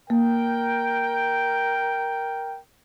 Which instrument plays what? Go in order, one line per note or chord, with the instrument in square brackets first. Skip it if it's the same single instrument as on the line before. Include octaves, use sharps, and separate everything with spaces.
[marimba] A#3 [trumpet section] A#4 G5